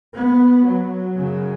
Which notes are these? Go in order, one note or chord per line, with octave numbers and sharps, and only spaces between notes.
B3
F#3
F#2 C#3